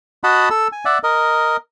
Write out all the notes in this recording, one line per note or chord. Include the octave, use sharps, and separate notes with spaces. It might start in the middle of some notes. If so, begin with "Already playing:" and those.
F#4 D#5 F#5 A5 B5
A4 E6
G#5
D5 E5 F#5
A#4 D#5